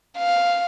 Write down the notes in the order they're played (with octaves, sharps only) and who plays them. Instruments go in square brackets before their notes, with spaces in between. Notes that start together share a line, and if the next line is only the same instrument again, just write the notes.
[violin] F5